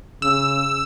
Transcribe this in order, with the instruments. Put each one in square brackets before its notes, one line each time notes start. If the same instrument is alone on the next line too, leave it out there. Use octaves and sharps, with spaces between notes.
[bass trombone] C#3 [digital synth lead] E6